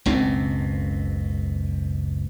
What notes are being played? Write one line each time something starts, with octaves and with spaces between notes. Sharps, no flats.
F#1 C#2 B2 C4